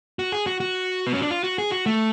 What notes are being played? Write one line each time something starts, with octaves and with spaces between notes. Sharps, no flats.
F#4
G#4
F#4
F#4
B3
C#4
D4
F4
F#4
G#4
F#4
A3